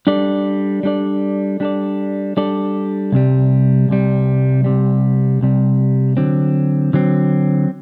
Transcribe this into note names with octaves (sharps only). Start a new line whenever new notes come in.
G3 D4 A4 D5
G3 D4 A4 D5
G3 D4 A4 D5
G3 D4 A4 D5
C2 C3 G3
C2 C3 G3
C2 C3 G3
C2 C3 G3
D3 F#3 C4
D3 F#3 C4